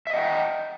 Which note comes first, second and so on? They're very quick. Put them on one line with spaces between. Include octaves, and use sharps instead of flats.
E5 D#5 F#5 G5